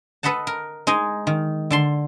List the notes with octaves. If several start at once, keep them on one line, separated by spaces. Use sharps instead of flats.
A4 B4 D#5 F#5 A5
A#4
G#3 D#4 D#5 G#5
D#3
D3 A5 C6